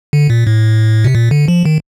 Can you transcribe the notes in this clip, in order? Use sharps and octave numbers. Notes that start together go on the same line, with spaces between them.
D3
A#2
A2
C3
A#2
D3
F3
D#3